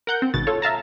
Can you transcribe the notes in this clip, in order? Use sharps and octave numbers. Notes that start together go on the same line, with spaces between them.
A#4 F#5 G6
C4
G#1 B2 A6
F4 A4 C#5
E5 F5 A5 A#5